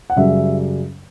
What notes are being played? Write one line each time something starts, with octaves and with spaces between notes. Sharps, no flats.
F#5
F#2 C#3 G3 E5